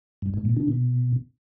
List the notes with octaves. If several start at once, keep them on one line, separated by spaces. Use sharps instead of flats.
G2
G#2
A#2
D3
B2